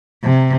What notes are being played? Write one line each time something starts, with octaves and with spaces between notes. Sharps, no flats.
C3